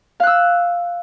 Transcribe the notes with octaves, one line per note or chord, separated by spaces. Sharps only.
F5 E6 F#6